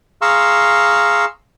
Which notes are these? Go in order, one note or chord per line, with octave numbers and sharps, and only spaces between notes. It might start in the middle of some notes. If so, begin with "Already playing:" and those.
G#4 F5 A#5 C6 C#6 E6